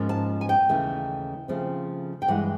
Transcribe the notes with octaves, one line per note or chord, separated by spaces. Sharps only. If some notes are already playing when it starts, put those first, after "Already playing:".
Already playing: G#2 F3 A#3 C#4
A5
G#5
G5
D#2 C#3 E3 A3
C#3 F3 A3 C4
G5
G2 E3 G#3 F#5